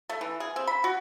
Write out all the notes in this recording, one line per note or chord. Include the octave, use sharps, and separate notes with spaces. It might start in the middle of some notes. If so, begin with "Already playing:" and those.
A3
E3
G#4
C4
B5
F#4